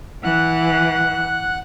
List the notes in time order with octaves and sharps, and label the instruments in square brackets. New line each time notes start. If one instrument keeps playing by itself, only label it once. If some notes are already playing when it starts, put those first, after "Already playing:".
[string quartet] E3 [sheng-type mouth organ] F#5 F#6